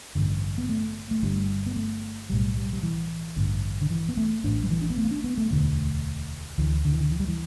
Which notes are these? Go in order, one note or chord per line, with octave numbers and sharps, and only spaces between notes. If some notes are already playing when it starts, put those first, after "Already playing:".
A1 G2 D3
B3
A3
A3
G1 G2 D3 G3
B3
A3
B1 A2 G3
G3
G3
E3
A1 G2 D3
D3
E3
B3
A3
A1 A2 D4
G3
E3
D4
B3
A3
B3
D4
B3
A3
E1 D2 D3 A3
D2 D3 E3
D3
E3
D3
E3
G3
E3